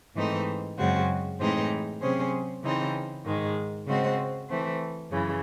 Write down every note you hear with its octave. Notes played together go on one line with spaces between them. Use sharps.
G#2 E3 A3 C4 D#4
F#2 C#3 G#3 C4 F#4
A2 E3 G#3 C4 D#4
C3 F#3 C#4 G#4 C5
C#3 E3 C4 D#4
G#2 D#3 G#3
C#3 G#3 C4 F#4 C5
E3 A3 C4
F#2 C#3 E3